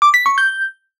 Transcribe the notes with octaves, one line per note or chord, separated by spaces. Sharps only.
D6
B6
C#6
G6